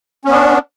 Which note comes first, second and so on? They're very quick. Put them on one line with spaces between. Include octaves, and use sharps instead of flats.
C#4 B3 D4